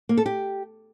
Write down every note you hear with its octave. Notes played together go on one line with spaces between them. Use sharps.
A#3
A4
G4